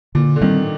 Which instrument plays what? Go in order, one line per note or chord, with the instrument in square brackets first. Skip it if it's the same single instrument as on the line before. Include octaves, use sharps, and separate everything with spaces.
[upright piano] A#2 [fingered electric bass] D3
[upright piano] D3
[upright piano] D#3 [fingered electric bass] G3 C4